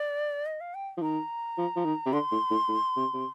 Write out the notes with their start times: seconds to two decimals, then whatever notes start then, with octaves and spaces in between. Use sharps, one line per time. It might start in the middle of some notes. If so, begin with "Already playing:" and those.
Already playing: D5
0.46 D#5
0.60 F5
0.74 G5
0.97 F3
1.02 D#3 A#5
1.58 F3
1.76 F3
1.85 D#3
2.06 C3
2.13 D3 C6
2.32 A2
2.51 A2
2.69 A2
2.97 C3
3.14 C3